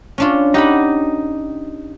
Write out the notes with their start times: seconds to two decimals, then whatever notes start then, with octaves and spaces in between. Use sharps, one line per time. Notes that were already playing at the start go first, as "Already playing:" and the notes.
0.18 C#4 D4 F4
0.54 D#4 G4 F#5 B5